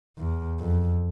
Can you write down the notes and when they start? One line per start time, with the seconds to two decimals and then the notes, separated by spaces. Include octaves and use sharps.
0.18 E2
0.60 F2